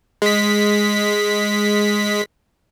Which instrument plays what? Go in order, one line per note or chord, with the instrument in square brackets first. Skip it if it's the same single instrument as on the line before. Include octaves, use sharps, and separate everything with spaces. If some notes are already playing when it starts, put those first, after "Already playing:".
[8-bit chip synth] G#3 B6